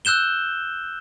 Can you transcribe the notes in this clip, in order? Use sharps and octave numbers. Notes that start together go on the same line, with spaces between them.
E6 F#6 G6 E7 G7